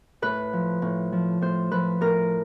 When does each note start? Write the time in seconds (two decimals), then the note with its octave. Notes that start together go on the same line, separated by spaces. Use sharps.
0.22 A2 B4
0.53 F3
0.82 A2
1.12 F3
1.41 A2 C5
1.71 F3 B4
2.01 A2 A#4